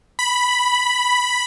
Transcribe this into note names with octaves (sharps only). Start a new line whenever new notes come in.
B5